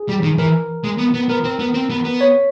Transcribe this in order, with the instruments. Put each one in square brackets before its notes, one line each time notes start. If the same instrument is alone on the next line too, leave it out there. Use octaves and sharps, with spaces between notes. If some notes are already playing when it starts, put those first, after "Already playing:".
Already playing: [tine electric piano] G#4
[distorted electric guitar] G3
D#3
[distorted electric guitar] E3 [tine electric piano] A#4
[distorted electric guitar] G#3
B3
B3
[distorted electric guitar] B3 [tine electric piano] A#4
[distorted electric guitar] C4
B3
C4
B3
B3
[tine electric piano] C#5